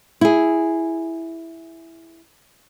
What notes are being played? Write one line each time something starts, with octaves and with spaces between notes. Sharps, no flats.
E4 G#4